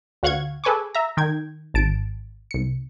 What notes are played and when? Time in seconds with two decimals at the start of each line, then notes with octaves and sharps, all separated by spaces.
0.23 D2 F#4 F5 F#5 C#6 G#6
0.64 G#4 A4 B4 G#5 C#6 D6
0.95 E5 A#5
1.17 D#3 G5 G#6
1.74 G#1 A5 D7
2.51 C2 C#7